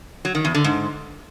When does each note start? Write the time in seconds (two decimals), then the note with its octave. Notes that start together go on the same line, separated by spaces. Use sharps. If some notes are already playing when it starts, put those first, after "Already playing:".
0.25 F#3
0.35 D#3
0.45 E2
0.54 D3
0.64 G#2